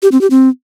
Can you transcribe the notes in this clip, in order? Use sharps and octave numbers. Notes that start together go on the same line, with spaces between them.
G4
C4
G4
C4